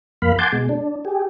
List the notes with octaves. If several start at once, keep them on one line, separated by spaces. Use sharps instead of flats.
F2 A#3 F5 B5
F#5 G#5 A5 C6 D6 G6
B2 G#3
D4
G4 G#4